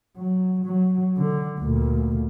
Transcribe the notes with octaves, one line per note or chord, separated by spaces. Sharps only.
F#3
F#3
D3
D2 A#2